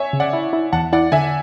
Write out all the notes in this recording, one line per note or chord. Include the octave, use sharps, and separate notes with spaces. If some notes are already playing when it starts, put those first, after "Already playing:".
Already playing: C#5 E5 G#5
C#3
D5 F#5
E4
E4
E2 F#5 A5
E4 D5 F#5
D3 E5 G#5